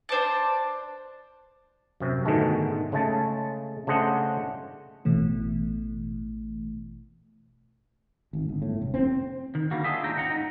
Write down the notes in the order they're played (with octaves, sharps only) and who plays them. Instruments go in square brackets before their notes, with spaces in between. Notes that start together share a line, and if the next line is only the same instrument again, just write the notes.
[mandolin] D4 C5 D5 A5
[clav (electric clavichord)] F#2 C3
G#2 B2 D3 D#3 G#3 A3
C#3 G#3 A3 A5
C#3 A3 D4 C5 D#5 F#5
[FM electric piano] A1 B2 E3 A3
[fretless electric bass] G#1
G1
A2
F1
C4
[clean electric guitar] D#3
D3 G3 A#3 F#4
D4 F4 G#4 D#5 E5
D#2 A2 G5 A#5
C#2 G#2 F#5 A#5
D#4